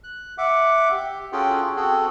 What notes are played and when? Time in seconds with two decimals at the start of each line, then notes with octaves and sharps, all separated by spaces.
0.04 F#6
0.38 E5 F#5 D6
0.92 G4
1.32 C#4 F4 F#4 G#4 A4 G5
1.76 C4 F#4 G#4 A4